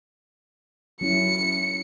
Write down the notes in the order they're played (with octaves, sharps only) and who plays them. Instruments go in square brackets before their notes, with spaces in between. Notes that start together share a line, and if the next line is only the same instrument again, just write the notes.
[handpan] F#3 C#4 E4 [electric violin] C#7